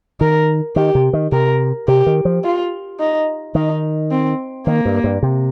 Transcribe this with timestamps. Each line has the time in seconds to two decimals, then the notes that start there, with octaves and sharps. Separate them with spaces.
0.20 D#3 A#4
0.76 D#3 G4
0.95 C3
1.13 D#3
1.32 C3 A#4
1.88 C3 G4
2.06 D#3
2.25 F3
2.44 F4
3.00 D#4
3.55 D#3 D#4
4.11 C4
4.67 D#3 A#3
4.85 G2
5.04 G2
5.23 C3